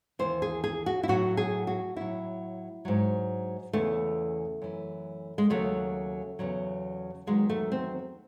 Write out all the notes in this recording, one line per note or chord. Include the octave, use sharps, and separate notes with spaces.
D#2 C#3 E3 C5
G#4
G#4
F#4
E4
A2 F#3 F#4
G#4
F#4
A2 F#3 E4
G#2 F#3
E2 C#3 E3 A3
F#2 E3
G#3
D#2 C#3 F#3 A3
E2 C#3 F#3
E2 D#3 F#3 G#3
A3
C4